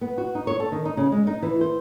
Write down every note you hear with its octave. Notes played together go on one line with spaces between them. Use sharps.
B3
F#4
D#4
C#5
A4
D#3
D#4
C#3
G#3
D#4
E3
C5